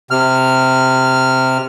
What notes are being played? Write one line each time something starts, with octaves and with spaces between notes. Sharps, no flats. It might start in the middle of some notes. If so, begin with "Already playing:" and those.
C3 F6